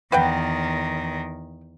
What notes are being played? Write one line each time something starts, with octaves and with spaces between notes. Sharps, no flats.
E2 D#3 B4 F#5 G5